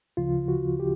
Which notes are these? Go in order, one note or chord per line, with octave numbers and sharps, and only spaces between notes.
D2 C#3 F3 F4
F#4
G4